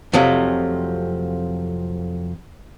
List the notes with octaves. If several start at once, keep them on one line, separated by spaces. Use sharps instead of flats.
F2 C3 F3 F#3 A3